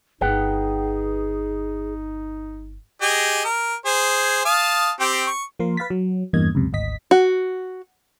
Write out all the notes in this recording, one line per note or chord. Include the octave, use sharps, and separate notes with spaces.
G1 D#4 G#4 B4 F#5 G5
G4 G#4 D#5
A#4
G#4 C5
F5 A5 D#6
C4 G4
C#6
F3 A#3 A#4 C6
B4 F5 A6 B6
F#3
E2 G2 A#3 D#5 G#6
C#2 F#2 C3
G#1 D2 D#5 B6
F#4